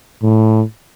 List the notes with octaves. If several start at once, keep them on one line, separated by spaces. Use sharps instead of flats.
A2